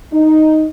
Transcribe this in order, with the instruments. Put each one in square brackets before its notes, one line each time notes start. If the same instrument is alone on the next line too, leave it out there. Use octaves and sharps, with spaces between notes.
[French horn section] D#4